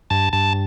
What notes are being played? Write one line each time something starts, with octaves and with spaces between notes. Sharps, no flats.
G2 A5
G2 A5